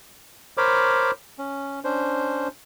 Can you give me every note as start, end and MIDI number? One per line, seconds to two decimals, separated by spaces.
0.57 1.11 70
0.57 1.11 72
0.57 1.11 73
0.57 1.11 83
0.57 1.11 86
1.38 1.80 61
1.84 2.48 61
1.84 2.48 62
1.84 2.48 72